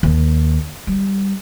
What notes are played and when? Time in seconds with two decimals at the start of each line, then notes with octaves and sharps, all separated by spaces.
0.03 D#2
0.87 G3